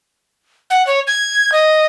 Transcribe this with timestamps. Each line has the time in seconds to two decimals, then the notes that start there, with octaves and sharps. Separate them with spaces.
0.70 F#5
0.87 C#5
1.07 G#6
1.52 D#5